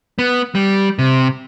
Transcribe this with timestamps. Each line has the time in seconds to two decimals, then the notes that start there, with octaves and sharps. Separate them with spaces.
0.19 B3
0.55 G3
0.99 C3